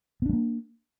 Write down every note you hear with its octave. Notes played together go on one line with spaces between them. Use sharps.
G#3 A#3 B3 D4